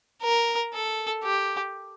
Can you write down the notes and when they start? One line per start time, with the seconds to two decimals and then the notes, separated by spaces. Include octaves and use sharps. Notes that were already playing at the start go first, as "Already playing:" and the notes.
0.23 A#4
0.73 A4
1.23 G4